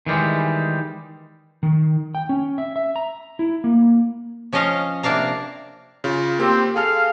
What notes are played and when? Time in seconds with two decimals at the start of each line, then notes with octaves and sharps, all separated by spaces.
0.06 D#3 E3 G3 G#3
1.63 D#3
2.15 G5
2.29 C#4
2.58 E5
2.76 E5
2.96 A#5
3.39 E4
3.64 A#3
4.52 F3 C#4 C#5 D#5 F5
5.03 C3 A#3 D4 F5 A#5
6.04 C#3 F4
6.39 A#3 C4 G4
6.76 G#4 A4 F5 F6